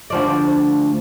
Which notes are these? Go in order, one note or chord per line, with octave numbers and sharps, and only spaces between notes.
D2 F3 D5